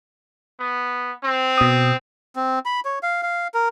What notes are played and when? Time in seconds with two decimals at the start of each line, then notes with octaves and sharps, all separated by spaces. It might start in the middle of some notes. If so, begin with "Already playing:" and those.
0.60 B3
1.23 C4
1.58 B2 D#6
2.36 C4
2.65 B5
2.85 C#5
3.03 F5
3.23 F5
3.54 A#4